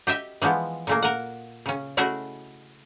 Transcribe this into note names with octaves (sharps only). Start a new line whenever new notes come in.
G4 D#5 E5 G5
E3 F3 G#3 B3
A#2 A3 A#3
A#4 F#5
C#3 C#4
A3 C#4 E4 F#4 G#4 D#5